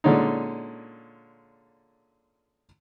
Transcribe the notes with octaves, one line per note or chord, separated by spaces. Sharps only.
A#2 D3 G#3 C#4 D#4